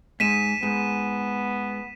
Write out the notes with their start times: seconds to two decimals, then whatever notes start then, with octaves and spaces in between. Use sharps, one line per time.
0.20 G#2 B6 D#7 E7
0.63 G#2 B3